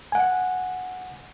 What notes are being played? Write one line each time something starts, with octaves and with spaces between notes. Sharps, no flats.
F#5 G#5